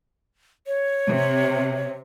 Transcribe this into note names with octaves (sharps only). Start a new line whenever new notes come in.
C#5
C3